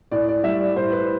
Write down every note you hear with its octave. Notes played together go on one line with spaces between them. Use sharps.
A2 D5
D5
G3 E5
D5
A2 C5
B4